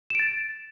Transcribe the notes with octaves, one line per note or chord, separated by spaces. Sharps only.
A6 D7 E7